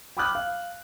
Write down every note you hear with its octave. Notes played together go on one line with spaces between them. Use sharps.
G5 B5 D6 D#6 F6 F#6
F5